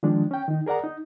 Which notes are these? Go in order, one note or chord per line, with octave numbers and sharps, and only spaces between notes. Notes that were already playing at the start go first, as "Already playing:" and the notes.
D#3 F3 G#3 D4
C#4 G5
D#3 D#4
G#4 A#4 D5 F#5 A#5
D#4